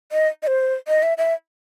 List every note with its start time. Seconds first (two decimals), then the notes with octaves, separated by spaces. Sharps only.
0.12 D#5
0.43 D#5
0.47 C5
0.88 D#5
1.03 E5
1.18 E5